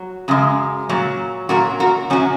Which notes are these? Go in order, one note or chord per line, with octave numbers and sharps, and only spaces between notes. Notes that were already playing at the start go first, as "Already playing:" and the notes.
Already playing: F#3
F#2 C#3 G#3
A#2 F#3
A#2 F#3 F#4 A#4
F#4 A#4
F#2 F#3 C#4 F#4